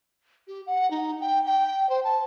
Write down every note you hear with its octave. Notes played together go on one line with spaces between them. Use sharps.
G4
F#5
D#4
G5
G5
C5
A5